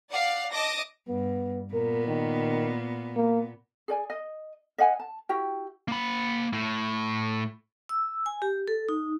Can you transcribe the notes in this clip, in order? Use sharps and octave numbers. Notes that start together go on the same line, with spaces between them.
D5 F5 F#5
D#5 A5 D6 A#6
G2 B3
A#2 B3 A#4
D#3
A#3
G#4 D5 G#5
D#5
D#5 F5 F#5 G#5
A5
E4 F#4 G4 G5
A#3 B5
A2
E6
G#5
G4
A4
D#4